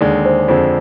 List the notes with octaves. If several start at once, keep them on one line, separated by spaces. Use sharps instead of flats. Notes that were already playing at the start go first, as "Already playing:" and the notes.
D#2 D3 G#3 D5
C5
F2 D3 G#3 C5